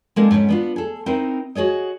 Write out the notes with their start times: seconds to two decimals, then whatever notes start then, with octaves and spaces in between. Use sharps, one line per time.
0.16 G#3 A#3 C4 D4 A4 A#4
0.31 G#2 C#4
0.49 B3 D4 F4
0.76 G#4 A4
1.06 C4 D#4 E4 A#4 C5
1.55 F#4 G#4 C#5 D#5